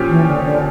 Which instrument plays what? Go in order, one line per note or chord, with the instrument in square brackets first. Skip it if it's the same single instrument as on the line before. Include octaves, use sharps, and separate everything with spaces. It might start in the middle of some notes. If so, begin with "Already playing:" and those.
Already playing: [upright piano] A#2 F3 C#4 G4
[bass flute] E3
D3
D3